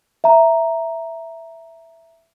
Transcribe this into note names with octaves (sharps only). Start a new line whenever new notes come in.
E5 A#5